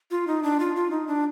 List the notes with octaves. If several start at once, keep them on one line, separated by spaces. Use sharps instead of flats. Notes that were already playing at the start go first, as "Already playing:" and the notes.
F4
D#4
D4
F4
F4
D#4
D4